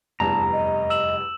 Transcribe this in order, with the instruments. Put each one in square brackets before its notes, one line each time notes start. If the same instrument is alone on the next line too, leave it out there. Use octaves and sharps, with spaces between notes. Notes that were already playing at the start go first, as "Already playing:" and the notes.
[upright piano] F1 E2 G2 [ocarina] A5 [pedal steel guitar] A#5
[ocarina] D#5
[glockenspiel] E6 E7 F#7